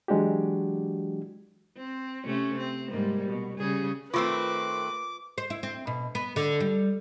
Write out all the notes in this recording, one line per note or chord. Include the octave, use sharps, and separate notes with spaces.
E3 F#3 G#3 D4 F#4 G4
C4
C3 A3 C#4
C4
G#2 G3 A#3
B2
C#3 G3 G#4
D#3 A3 C4 F4 B4 D6
C5
E4
C4
B2
B3
D3
G3